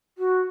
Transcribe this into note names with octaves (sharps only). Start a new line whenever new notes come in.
F#4